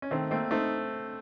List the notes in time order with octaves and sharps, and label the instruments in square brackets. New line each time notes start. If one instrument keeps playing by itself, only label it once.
[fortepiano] C#4
[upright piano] D#3 [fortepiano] A3 C4
[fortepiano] A3 C4 [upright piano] A#3
[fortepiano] A3 C4 [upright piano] D#4